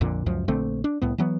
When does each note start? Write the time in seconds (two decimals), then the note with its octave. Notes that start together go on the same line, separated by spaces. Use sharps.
0.01 A#1 F2 A#2 D3
0.26 C#2 F#2 F3
0.48 A#1 D3 A3 C4
0.84 D4
1.02 C2 A2 B3
1.18 E3 F#3 B3